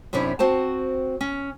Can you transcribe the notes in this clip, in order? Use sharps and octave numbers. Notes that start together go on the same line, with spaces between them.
F#2 C3 C#4 D4 E4
C4 F#4 C5 A5
C#4